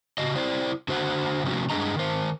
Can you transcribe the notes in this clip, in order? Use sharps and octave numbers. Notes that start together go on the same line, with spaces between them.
C#3 F#4 D#5
E4 C5 D5
D3 F#4 C5 D#5 F#5
C3 F3 A3 C#4 F#4
G2 G#3 D4 G#4 D#5 A#5
D#3 C5